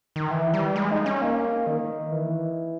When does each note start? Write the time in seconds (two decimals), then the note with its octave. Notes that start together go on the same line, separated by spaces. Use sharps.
0.16 D#3
0.31 E3
0.54 G3
0.76 G#3
0.91 D#4
1.06 C#4
1.22 A#3
1.67 D#3
2.12 E3